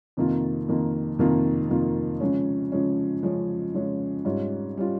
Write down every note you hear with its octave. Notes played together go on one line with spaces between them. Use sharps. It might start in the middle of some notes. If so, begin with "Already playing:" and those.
F2 C3 D#3 A#3 F4
F2 C3 D#3 A#3 F4
F2 C3 D#3 A#3 F4
F2 C3 D#3 A#3 F4
C#3 F3 G#3 C#4
C#3 F3 G#3 C#4
C#3 F3 G#3 C#4
C#3 F3 G#3 C#4
G#2 G3 C#4 F4
G3 C#4 F4